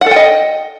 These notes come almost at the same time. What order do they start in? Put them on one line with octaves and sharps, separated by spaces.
F#5 A4 G5 D#5